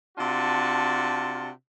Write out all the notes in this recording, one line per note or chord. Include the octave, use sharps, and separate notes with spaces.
C3 D4 F4 F#4 A5